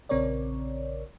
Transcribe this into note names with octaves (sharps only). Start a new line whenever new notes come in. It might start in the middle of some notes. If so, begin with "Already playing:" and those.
A#1 C#3 C4 A#4 C#5 D5